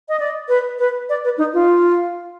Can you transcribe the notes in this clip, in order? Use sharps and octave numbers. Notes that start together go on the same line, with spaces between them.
D#5
D5
B4
B4
D5
B4
D#4
F4